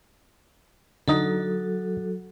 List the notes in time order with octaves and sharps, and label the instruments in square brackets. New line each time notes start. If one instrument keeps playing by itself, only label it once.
[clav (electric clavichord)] D3 D#4 [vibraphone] F#3 F#4 A4